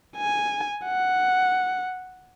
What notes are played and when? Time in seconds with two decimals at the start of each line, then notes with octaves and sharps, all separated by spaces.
0.17 G#5
0.85 F#5